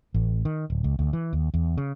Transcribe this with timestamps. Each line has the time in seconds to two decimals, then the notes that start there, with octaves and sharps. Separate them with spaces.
0.14 A1
0.45 D#3
0.70 D1
0.84 C#2
0.99 D2
1.13 E3
1.33 D#2
1.54 E2
1.77 C#3